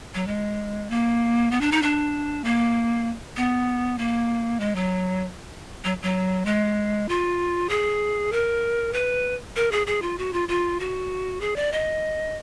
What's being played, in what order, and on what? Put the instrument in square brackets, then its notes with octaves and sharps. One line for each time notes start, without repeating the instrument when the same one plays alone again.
[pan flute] F#3
G#3
A#3
B3
D4
D#4
D4
A#3
B3
A#3
G#3
F#3
F#3
F#3
G#3
F4
G#4
A#4
B4
A#4
G#4
G#4
F4
F#4
F4
F4
F#4
G#4
D5
D#5